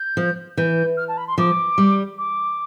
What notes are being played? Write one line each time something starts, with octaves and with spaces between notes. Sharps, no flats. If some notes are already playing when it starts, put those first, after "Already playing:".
Already playing: G6
F3
E3 G6
F6
A5
B5
C6
F3 D6
G3
D6